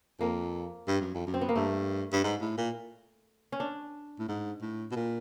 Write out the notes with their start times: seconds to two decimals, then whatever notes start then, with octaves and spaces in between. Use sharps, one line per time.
0.19 F2 A#3
0.88 G2
1.01 F#2
1.14 F2
1.27 F#2
1.34 C4
1.41 B3
1.49 A#3
1.56 G2 A3
2.13 G2
2.24 G#2
2.41 A2
2.58 A#2
3.52 C#4
3.60 D4
4.19 A2
4.29 G#2
4.62 A2
4.91 B2
4.96 A#2